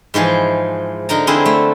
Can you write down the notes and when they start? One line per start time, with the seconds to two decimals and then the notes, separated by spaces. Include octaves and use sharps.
0.14 G#2 E3 F3 G#4
1.09 D3 D#4 A#4 A#5
1.27 D3 C4 E4 F4 G#4
1.46 A3